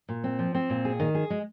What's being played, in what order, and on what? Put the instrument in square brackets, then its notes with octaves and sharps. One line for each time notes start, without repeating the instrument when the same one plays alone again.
[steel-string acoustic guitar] A#2
C4
F3
C4
A#2
G#4
D#3
G#4
G#3